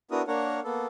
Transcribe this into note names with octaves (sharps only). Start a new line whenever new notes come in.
B3 D4 E4 F#4 A#4 D#6
A#3 D4 A#4 C#5 F#5
A#3 B3 A4